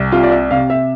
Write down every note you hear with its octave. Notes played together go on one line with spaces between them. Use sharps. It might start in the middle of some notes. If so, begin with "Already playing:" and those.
Already playing: C2
C3 F4
D5
E5
C3 F5
E5